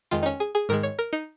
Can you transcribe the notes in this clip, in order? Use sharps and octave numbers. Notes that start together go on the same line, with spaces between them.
F2 D#3 G#3 F4
D#4
C#4
G#4
G#4
G#2 D#3 G#3 A#4
C#5
A#4
D#4